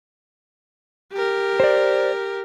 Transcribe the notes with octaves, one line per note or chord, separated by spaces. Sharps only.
G4 A#4
C5 D5